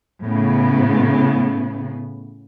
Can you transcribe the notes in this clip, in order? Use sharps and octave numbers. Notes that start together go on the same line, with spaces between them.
A2 C#3 B3